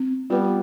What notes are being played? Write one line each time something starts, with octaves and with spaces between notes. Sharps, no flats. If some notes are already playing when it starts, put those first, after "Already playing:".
Already playing: C4
G3 B3 F4